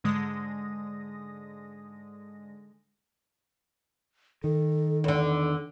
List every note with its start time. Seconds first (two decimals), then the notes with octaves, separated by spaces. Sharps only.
0.04 G#2 D3 G#3 D#6 A#6
4.44 D#3 A4
5.04 E2 D3 A4